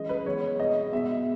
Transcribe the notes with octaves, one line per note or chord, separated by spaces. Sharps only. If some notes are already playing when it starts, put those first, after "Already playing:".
Already playing: E3 G#3 C#4 D#5
B4
E3 G#3 B3 C#5
B2 G#3 B3 D#5
B2 G#3 B3 E5